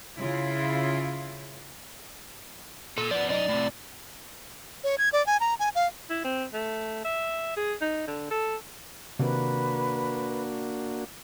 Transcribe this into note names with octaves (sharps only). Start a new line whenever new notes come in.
C#3 E4 F4
A#2 A4
F3 B3 D5
F#2 D#4 D5
A2 C3
C#5
G#6
D5
G#5
A#5
G#5
F5
E4
C4
A3
E5
G#4
D#4
D3
A4
C3 D#3 A#3 D4 F#4 B4